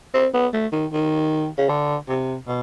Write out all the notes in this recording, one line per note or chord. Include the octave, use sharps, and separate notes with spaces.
C4
B3
A3
D#3
D#3
C#3
D3
C3
B2